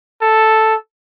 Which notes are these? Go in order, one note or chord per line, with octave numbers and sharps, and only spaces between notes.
A4